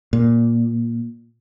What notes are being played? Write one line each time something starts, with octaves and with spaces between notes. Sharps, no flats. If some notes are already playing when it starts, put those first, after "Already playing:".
A#2